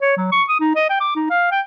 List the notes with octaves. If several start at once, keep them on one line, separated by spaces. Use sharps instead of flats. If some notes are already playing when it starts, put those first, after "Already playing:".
C#5
F#3
C#6
D#6
D#4
D#5
G5
D6
D#4
F5
G5